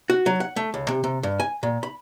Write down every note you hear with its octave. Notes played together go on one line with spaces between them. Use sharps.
F#4
F#3
F#5
A3
C#2
C3
C3
G2
G#5
A#2
B5